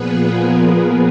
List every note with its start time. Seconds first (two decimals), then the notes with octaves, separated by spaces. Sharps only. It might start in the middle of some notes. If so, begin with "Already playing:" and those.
Already playing: A#2 F3 B3 G#4 B4
0.18 A#4